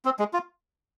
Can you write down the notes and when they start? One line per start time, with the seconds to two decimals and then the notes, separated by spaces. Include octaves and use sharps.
0.05 C4
0.19 G#3
0.33 F4